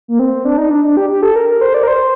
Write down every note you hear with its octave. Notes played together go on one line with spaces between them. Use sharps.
A#3
C4
D4
D#4
D4
D4
G4
G4
A4
A#4
A#4
C5
D5
A#4
C5